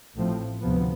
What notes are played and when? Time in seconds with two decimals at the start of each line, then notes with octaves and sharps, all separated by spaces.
0.16 A1 A2 F3 C4
0.62 D2 C3 F3 B3